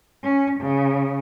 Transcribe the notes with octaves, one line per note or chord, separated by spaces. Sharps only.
C#4
C#3